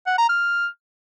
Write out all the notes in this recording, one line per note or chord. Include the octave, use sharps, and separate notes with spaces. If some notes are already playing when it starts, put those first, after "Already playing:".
F#5
A#5
F6